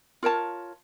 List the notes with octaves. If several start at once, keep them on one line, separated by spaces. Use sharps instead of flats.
F4 A#4 C#5 A5